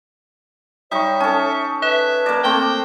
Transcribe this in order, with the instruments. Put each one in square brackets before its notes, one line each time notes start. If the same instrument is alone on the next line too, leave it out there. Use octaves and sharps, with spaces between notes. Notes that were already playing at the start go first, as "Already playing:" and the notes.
[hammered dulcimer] G3 D#4 [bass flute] C#5 [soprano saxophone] E5 [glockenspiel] C#6 D#6
[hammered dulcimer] C#4 A4 [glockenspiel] A5
[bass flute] B4 [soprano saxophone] E5 [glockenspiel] F#6 E7
[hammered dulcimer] A#3 D5 [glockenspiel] A#6 E7
[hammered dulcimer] A3 C4 [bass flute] A#3 [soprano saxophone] G5